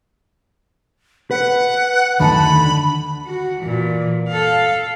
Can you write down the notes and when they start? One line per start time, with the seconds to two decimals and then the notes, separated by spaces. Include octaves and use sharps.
1.31 B4 F#5
2.20 D2 D3 D#3 G#5 A5 B5
3.26 F#4
3.60 A#2 E3
4.28 A4 F5